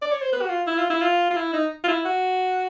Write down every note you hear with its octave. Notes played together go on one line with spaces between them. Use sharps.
D5
C#5
C5
B4
F#4
F4
E4
F4
E4
F4
F4
E4
D#4
F4
E4
F#4